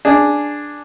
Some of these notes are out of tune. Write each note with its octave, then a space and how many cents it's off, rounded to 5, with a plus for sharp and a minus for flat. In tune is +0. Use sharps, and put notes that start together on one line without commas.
D4 +0 G#4 +0